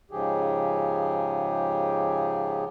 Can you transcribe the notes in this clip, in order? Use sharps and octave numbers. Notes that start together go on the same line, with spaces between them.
G#2 C#3 F3 G4 G#4